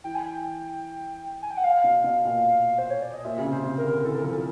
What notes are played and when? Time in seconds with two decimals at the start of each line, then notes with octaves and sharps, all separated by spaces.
0.04 E3 G5
0.15 G#5
0.26 G5
1.42 G#5
1.51 G5
1.57 F#5
1.64 F5
1.84 B2
2.04 B2
2.25 A#2
2.78 C5
2.90 C#5
3.02 D5
3.14 D#5
3.25 A#2 E5
3.38 C#3
3.44 C3
3.51 C5
3.64 C3
3.78 A#4
3.84 D3
4.04 E3 A4
4.16 A#4
4.24 F3 A4